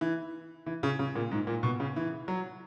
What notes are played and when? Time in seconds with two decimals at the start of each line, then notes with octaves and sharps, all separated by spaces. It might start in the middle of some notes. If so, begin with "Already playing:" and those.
0.01 E3
0.66 E3
0.83 C#3
0.99 C#3
1.15 A#2
1.31 G#2
1.47 A#2
1.63 B2
1.80 C#3
1.96 E3
2.28 F#3